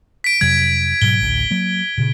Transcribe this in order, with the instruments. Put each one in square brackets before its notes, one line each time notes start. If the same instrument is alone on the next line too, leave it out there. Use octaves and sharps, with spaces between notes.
[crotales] B6 D7
[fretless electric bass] F2 C3 F#3 [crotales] G#6
[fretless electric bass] G#2 B2 F#3 [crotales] G7
[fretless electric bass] A1 D2
F#3 A#3
A#2 C#3